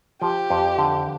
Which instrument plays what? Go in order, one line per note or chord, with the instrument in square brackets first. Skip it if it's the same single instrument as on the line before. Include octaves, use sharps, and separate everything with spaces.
[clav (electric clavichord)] F3 [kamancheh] G4
[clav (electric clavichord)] F2
D3